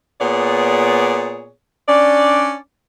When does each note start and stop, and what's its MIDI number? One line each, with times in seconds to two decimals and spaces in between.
0.20 1.50 46
0.20 1.50 59
0.20 1.50 68
0.20 1.50 73
0.20 1.50 74
1.88 2.56 61
1.88 2.56 62
1.88 2.56 74